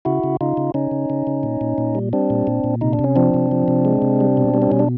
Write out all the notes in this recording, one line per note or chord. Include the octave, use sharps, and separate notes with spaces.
C#3 E4 F#4
C#3
C#3 D#4 F4
C#3
C#3 C#4 D#4
C#3
C#3
C#3
A#2
A#2
A#2
G3
G3 C4 D4
A#2
A#2
A#2
C3 D#4
D4
C3
C#4
F3 C4 D4
C3
F3
C3
G#3
C3
G3
B2
G3
C4
B2 C#4
D4